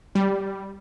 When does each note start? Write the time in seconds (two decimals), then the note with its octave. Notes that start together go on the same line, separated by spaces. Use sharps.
0.15 G3